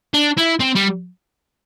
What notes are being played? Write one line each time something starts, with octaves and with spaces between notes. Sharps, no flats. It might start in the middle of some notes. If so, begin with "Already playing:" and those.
D4
E4
C4
G3